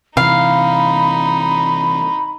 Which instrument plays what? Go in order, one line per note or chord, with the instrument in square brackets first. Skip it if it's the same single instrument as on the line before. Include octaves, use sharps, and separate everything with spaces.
[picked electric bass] C3 E3 [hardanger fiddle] D#4 [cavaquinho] F5 [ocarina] B5